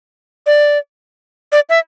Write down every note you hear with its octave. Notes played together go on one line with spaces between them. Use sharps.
D5
D5
E5